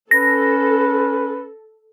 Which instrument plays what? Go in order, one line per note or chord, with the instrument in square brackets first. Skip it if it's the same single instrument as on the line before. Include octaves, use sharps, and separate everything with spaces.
[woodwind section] C#4 [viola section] A4 [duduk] B4 [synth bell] A#6